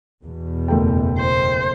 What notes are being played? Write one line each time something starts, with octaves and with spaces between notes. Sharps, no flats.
E2 B2
F#1 A3 G5
C5